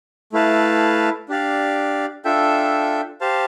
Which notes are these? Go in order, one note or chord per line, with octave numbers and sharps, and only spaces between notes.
A3 E4 B4 F5 A5
D4 G4 D5 F5
D4 F4 A4 E5 G5
G4 C5 F5 A5